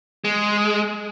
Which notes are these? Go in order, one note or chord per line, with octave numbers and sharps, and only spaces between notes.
G#3